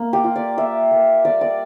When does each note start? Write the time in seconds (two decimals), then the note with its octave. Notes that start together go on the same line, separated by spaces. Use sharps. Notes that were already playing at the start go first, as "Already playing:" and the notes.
Already playing: A#3
0.13 G4
0.24 F4
0.36 D5
0.57 F4 E5
0.91 A#3
1.25 G3 D5
1.41 D5